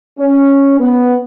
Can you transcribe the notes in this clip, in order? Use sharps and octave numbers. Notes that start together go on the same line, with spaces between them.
C#4
B3